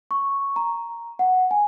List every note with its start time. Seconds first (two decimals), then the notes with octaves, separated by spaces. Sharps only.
0.11 C#6
0.56 A#5
1.19 F#5
1.51 G#5